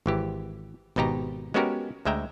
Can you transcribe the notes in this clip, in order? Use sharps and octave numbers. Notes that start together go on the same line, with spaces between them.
G#1 E3 G4
G#1 B2 D#4 G4 A#5
G#3 B3 C#4 F#4 G4 A#4
D2 G#3 E5 G5 A#5